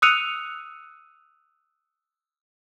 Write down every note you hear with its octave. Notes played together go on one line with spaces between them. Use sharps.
D#6 E6 F#6 C#7 D#7 F7